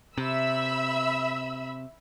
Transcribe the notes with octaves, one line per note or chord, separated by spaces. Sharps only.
C3 E5 B5 E6